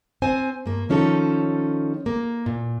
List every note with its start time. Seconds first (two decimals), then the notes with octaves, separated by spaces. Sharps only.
0.22 C4 C5 G#5
0.66 G2 A#3
0.89 D#3 F3 C#4 D#4 A4
2.06 A#3
2.46 A#2